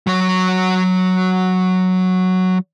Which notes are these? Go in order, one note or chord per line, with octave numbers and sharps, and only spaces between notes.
F#3 C#5